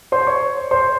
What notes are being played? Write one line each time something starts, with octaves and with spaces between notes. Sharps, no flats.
C5 C6
C#5 C#6
C5 C6